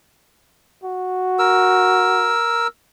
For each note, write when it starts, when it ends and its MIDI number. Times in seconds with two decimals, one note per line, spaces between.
0.84 2.37 66
1.39 2.67 70
1.39 2.67 88